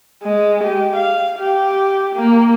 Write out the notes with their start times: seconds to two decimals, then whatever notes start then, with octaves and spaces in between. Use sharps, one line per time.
0.23 G#3
0.64 G4
0.96 F5
1.38 G4
2.16 A#3